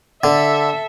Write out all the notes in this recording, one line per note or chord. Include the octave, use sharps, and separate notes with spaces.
D3 A4 E5